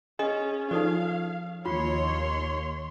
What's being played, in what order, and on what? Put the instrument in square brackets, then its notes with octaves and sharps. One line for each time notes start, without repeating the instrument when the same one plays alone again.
[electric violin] C#4 [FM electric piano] G#4 [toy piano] D#5
[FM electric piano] F3 [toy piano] D#4 A4 D5 [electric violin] F5
[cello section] D#2 C#5 [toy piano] F4 [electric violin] C6